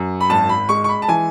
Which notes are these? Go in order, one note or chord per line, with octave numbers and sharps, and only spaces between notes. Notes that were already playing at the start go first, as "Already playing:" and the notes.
Already playing: F#2
B5
G#1 A5
B5
G#3 C#6
C#6
B5
A5
E3 G#5